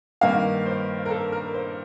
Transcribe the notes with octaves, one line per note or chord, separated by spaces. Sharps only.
G2 D#3 A#3 F5
C5
A#4
A4
A#4
C5